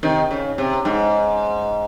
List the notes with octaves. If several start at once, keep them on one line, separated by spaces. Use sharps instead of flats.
C3 D#3
C#3
C3
G#2